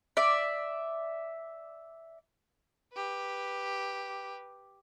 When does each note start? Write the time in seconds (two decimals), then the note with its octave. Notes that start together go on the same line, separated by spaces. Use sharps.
0.17 D5 E5
2.93 G4 B4